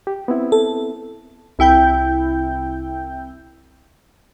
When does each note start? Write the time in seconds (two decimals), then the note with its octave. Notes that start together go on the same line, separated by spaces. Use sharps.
0.07 G4
0.28 B3 C4 E4
0.52 A4
1.59 C2 E4 G5 G6